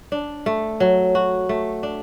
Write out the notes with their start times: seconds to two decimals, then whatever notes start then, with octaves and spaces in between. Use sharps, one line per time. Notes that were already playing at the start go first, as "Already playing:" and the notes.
0.12 D4
0.46 A3
0.80 F#3
1.15 F#4
1.49 A3
1.83 D4